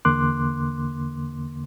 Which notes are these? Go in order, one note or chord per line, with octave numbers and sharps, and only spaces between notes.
E2 D3 A#3 C6 D6 F#6